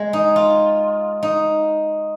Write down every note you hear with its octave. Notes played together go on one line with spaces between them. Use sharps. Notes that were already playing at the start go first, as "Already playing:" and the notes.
Already playing: G#3
D#4
F4
D#4